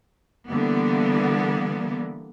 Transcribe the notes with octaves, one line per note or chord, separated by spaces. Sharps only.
D3 E3 G3 A#3 B3